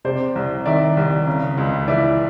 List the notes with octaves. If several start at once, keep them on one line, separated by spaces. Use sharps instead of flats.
C3 C5 D5
C2
D#3 D5 E5
C2
C#3
C#2
E3 D5 E5